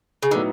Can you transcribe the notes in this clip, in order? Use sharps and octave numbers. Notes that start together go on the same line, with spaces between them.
C#3
A2 D3 F#3 B3 D#4